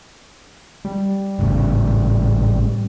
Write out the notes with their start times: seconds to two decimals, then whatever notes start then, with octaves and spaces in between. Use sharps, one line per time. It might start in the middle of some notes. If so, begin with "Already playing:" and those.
0.85 G3
1.39 G#1 A2 C#3